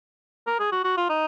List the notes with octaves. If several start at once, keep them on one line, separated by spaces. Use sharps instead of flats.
A#4
G#4
F#4
F#4
F4
D#4